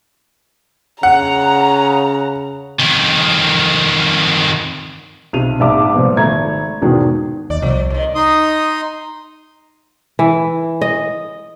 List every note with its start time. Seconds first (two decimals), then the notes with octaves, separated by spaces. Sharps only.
1.03 C#3 F#5 A#5
2.79 F2 D#3
5.33 B1 C3 D#7 F7
5.60 A#1 G#2 E5 A5 D6
5.94 A#2 F3 G3 B3
6.17 G#1 A3 A#5 G#6
6.82 E2 G#2 B2 D#3
7.50 D#2 D5
7.62 C2 F3
7.90 D#2 D#3
8.15 D#4 C6 D#6
10.19 E3
10.81 D#5